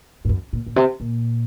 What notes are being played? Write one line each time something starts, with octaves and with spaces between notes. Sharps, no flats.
G#2
F#2
A#2
A#2
C3
A#2